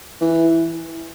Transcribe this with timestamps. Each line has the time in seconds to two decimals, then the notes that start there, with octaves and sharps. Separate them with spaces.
0.21 E3